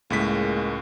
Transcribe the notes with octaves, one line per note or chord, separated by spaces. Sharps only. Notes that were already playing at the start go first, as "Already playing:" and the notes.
C#2 A2 G#3 A#3 B6